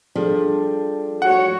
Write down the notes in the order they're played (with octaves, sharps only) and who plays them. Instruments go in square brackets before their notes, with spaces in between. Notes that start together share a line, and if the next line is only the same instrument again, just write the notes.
[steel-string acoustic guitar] F3 G3 D4 [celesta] G#4 A4
[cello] F#4 C#5 [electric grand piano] F#5